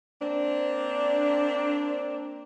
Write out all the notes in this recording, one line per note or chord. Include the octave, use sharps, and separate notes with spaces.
A#3 C4 D4